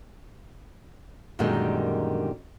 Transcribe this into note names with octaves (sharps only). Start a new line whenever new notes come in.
F#2 A#2 D3 D#3 G3 G#3